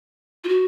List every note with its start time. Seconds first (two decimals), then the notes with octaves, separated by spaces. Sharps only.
0.44 F4
0.48 F#4